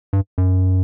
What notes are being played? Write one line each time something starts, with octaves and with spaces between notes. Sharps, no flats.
G2
F#2